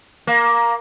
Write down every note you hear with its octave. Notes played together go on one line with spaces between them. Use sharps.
A#3